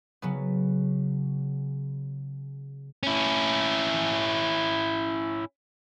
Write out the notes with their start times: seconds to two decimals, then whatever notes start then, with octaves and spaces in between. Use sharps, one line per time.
0.22 C#3 F#3 B3
3.03 C#4 E4